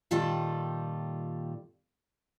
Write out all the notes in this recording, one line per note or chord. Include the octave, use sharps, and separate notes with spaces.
A#2 D#3 G3 F4 A4 A5